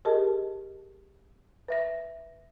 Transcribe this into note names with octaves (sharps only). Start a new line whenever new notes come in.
G4 G#4 A#4 D#5 A5
B4 E5 A#6